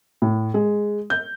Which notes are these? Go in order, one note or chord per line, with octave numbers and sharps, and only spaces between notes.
A2
G#3
G6